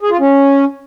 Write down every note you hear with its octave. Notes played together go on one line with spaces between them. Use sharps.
G#4
F4
C#4